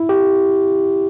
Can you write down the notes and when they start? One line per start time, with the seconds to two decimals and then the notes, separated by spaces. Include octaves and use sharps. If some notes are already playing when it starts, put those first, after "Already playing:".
Already playing: E4
0.09 G4